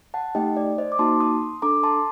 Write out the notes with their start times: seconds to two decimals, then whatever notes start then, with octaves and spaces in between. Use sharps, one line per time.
0.14 F#5 A5
0.35 A3 D#4 G4 D#5 G5
0.57 D5
0.78 C5 D#5
0.92 D6
0.99 A#3 D#4 F#4 A5 C6
1.20 C6 D#6
1.62 D4 A4 A#5 D6
1.83 A5 C6